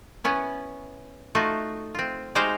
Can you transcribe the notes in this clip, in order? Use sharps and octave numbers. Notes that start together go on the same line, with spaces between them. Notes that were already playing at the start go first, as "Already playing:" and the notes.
B3 C#4 E4
A3 D#4 F4 F#4
C4 F4
G#3 D#4 F#4 G4 C5 F5